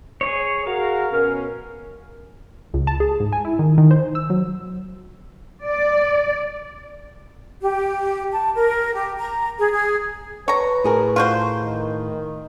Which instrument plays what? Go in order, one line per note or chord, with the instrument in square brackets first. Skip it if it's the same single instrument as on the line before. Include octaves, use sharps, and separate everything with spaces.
[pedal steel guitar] G#4 C#5
[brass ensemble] F#4 G#4 A#4 [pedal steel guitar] F5
[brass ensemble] B2 C#4 [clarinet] A#4
[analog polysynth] C#2
A5
G#4
G#2
G#5
E4
D#3
D#3
C5
E6
F#3
[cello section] D5
[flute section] G4
A5
A#4
G4
A#5
G#4
G#4
[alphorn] B4 [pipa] C#5 A#5
[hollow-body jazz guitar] A2 G#4 A#4
[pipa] F4 F#4 C5
[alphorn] D#3